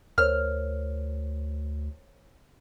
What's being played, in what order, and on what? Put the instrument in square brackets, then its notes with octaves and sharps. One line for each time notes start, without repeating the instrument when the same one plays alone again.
[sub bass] D2 [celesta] A#4 C5 C#5 [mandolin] F6